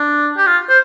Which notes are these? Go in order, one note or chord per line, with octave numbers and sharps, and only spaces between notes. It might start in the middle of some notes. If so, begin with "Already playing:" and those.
Already playing: D4
G4
F4
C5